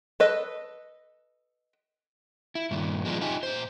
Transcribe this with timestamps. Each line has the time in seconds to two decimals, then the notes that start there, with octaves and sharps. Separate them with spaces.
0.20 A4 B4 D#5
2.55 E4
2.71 G2 A#2 D#3
3.05 F3 G#3 B3 C4 D4 F4
3.21 D#4 F4 G4 D#5 G#5
3.43 A#2 C5